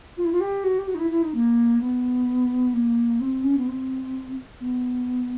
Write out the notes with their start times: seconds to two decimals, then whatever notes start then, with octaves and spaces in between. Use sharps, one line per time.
0.17 F4
0.25 E4
0.32 F4
0.40 G4
0.64 F#4
0.78 G4
0.87 F#4
0.95 D#4
0.99 E4
1.10 E4
1.22 D#4
1.34 A#3
1.81 B3
2.73 A#3
3.20 C4
3.44 C#4
3.57 B3
3.67 C4
4.60 B3